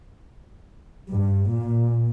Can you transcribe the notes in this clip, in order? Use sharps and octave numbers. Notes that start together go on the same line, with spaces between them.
G2
A#2